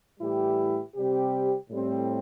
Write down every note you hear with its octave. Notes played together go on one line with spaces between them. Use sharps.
A2 E3 G3 E4 G4
C3 G3 C4 G4
A2 G3 C4